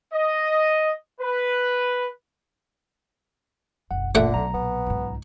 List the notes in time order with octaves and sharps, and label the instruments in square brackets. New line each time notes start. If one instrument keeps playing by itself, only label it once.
[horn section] D#5
B4
[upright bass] F#1 B1 [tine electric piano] F#5
[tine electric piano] A#2 [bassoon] D3 [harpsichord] A3 F#5 G5
[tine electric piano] B1 A#5
[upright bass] A#2 [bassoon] B3
[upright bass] C#2 G#2